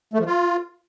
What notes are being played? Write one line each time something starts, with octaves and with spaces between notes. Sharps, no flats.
A3
F3
F4